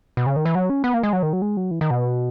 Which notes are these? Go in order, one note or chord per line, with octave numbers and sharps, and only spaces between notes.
B2
C#3
D#3
E3
F#3
C#4
B3
A#3
G#3
F#3
D#3
F#3
G#3
F#3
E3
D#3
B2